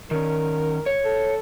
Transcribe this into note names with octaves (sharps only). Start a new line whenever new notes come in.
D#3 C#4 A#4
C#5
A4